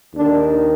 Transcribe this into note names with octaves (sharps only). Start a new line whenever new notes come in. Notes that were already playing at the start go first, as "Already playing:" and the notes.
D#2 D#3 D4